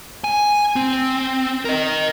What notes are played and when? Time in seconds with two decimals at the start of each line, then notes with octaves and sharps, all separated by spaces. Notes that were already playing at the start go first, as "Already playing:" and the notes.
0.24 G#5
0.76 C4
1.65 A#4 D#5